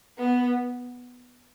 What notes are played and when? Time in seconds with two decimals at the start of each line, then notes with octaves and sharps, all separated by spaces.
0.19 B3